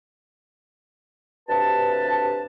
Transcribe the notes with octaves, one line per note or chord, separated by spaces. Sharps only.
D2 G2 C3 B4 A5